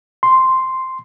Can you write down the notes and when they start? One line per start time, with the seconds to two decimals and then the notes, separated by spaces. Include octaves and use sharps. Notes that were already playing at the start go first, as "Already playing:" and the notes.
0.23 C6